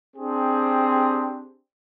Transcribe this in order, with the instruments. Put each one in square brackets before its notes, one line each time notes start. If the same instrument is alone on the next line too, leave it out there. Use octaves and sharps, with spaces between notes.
[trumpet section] C4 D4 G4 G#4